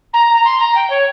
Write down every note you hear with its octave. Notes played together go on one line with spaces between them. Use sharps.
A#5
A#5
C6
A#5
G5
C#5